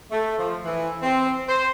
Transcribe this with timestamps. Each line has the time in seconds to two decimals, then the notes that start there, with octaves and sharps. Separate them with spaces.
0.11 A3
0.38 F3
0.65 E3
1.02 C4
1.49 C5